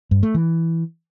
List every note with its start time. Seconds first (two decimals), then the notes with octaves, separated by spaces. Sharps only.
0.11 G2
0.23 A3
0.34 E3